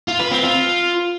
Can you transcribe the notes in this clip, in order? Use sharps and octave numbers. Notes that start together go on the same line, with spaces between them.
F4
B4
C4
F4